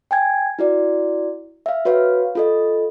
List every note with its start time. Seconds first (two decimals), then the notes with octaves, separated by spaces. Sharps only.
0.11 G5 G#5 G#6
0.59 E4 F#4 D5
1.66 E5 F5
1.85 F#4 B4 C#5 F5
2.35 F4 A4 D#5